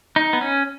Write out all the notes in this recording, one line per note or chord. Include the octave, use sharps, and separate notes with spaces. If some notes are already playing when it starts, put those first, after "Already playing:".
D#4
B3
C#4